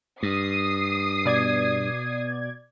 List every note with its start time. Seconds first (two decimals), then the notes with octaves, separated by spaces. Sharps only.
0.23 G2 D#6 C7
1.25 B2 D5 G#6